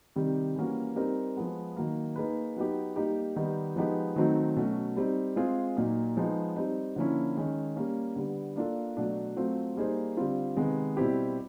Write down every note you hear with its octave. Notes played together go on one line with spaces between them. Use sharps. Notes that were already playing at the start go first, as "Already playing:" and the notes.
C3 D#3 G3
E3 G3 A#3 C#4 F#4
G3 C4 D#4 G4 A#4
F3 G#3 B3
D#3 F#3 A#3
A#3 D#4 G#4 B4
F#3 B3 D#4 G4
G3 A#3 D#4 G4
D#3 G3 B3 D#4
F3 G#3 B3 D#4 G4
D#3 F#3 A3 C4 D#4
B2 F#3 A3 C#4 F#4
G3 C4 D#4
G#3 C4 F4 G#4
A#2 F#3 A#3 D#4
F3 G#3 B3 D#4
G3 C4 D#4
D3 F3 A#3 C#4 E4
D#3 G#3 C#4
G3 A#3 C#4
D3 G3 B3
A#3 D4 F4 A4
B2 F#3 A3 D4
F#3 A3 C4 F4
G3 A#3 D#4 G#4 C5
D3 G3 C4 F4
C3 D#3 G#3 B3
B2 G3 C4 E4 G4